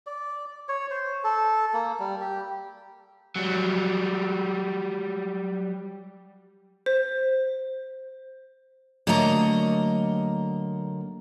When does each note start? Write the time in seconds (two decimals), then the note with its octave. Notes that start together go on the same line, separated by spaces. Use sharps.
0.07 D5
0.69 C#5
0.91 C5
1.24 A4
1.74 A#3
1.99 G3
2.21 G4
3.36 F#3 G3
6.86 C5
9.07 D3 F#3 A3 A#3 D#5 A#5